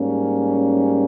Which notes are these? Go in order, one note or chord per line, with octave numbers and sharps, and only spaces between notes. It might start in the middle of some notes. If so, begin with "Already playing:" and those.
Already playing: G#2 G3 A#3 C#4